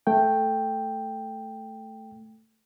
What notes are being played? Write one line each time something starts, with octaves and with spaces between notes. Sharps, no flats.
A3 G5